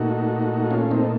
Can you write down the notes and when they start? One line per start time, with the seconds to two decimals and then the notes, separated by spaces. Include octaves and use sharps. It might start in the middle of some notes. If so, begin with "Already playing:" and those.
Already playing: A#2 A3 D#4 F#4
0.70 C#4 F4
0.91 C4 D#4